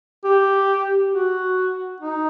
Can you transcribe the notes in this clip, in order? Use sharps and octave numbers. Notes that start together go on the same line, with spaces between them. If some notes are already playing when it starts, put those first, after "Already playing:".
G4
F#4
D#4